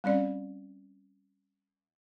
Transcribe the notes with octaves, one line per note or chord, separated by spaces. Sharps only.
G3 C4 C#4 D5